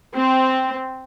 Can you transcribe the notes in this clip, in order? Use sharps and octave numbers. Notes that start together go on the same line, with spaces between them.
C4